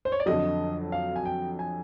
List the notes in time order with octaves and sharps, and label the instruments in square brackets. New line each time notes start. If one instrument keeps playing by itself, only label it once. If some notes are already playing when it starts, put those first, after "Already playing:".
[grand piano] C5
C#5
D5
[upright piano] F2 D3 F#3 [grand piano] D#5
[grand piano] F5
G#5
G5
G#5